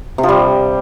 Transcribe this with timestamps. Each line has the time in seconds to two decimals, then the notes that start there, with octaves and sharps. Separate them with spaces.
0.18 C3
0.23 F3
0.28 G3